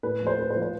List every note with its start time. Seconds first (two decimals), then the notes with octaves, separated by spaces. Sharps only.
0.03 A2 B4
0.21 F3
0.27 C5
0.38 A2 B4
0.50 C5
0.56 F3
0.62 C5